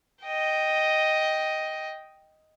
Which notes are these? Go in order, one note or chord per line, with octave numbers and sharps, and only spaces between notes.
D#5 G5